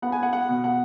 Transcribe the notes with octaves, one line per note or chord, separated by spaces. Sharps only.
B3 F#5
G#5
F#5
F#5
B2
F#5